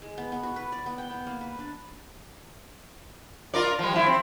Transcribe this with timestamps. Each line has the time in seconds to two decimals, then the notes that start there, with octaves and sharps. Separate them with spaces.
0.02 G#3
0.18 B3
0.32 B3
0.43 F#4
0.56 B4
0.72 D5
0.86 B3
0.98 G5
1.10 B3
1.27 A#3
1.41 B4
1.59 D4
3.54 F4 A#4 D5
3.79 F3 G3
3.93 F3 E4
4.06 C4